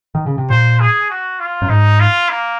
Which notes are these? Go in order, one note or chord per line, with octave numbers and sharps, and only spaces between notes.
D#3
C#3
C3
A#2 C5
G#4
F#4
F4
F#2
G#2 D#4
F4
A#3